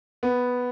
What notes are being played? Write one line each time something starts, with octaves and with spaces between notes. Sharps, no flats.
B3